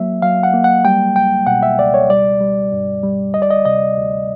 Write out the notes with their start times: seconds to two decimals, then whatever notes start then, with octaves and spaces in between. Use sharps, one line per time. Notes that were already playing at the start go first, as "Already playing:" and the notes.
Already playing: F#3 A#3 E5
0.22 F#3 F5
0.43 F#5
0.54 A#3
0.64 F#5
0.85 G3 G5
1.16 C#2 G5
1.47 B2 F#5
1.63 E5
1.78 C#2 D5
1.94 C#5
2.10 G3 D5
2.41 G3
2.72 G2
3.03 G3
3.34 D2 D#5
3.42 D5
3.50 D#5
3.65 C3 D#5
3.97 D2